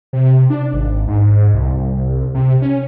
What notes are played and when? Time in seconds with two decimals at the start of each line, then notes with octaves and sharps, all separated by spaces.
0.13 C3
0.50 D4
0.73 G#1
1.08 G#2
1.53 C2
2.34 C3
2.62 C#4